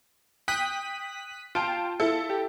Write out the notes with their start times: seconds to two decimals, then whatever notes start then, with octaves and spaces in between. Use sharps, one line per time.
0.48 G5 D#6 F#6 B6
1.55 F4 G5 A5 D7
2.00 E4 A4
2.30 G4